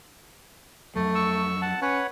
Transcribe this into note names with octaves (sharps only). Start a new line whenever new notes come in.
F2 F#3 A3
C#6 E6
F#5 A5
C#4 B4 C#5 F#5